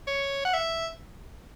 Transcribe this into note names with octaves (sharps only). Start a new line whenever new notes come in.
C#5
F#5
E5